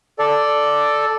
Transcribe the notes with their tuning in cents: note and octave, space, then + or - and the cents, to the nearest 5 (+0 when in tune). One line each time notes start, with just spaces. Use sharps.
A4 +0 D5 +0